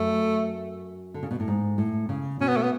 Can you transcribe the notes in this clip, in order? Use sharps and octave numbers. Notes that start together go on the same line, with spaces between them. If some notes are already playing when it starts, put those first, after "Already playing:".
Already playing: F#2 A3
D3
C#3
B2
A2
G#2
A2
C#3
B2 C#4
B3
A3
B3